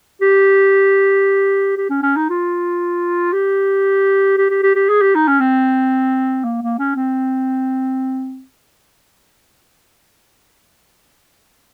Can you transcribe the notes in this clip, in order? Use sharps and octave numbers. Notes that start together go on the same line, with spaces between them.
G4
G4
C#4
C#4
D#4
F4
G4
G4
G4
G4
G4
G#4
G4
D#4
C#4
C4
A#3
A#3
C#4
C4